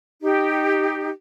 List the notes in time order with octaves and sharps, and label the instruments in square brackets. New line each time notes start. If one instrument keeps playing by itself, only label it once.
[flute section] D#4 G4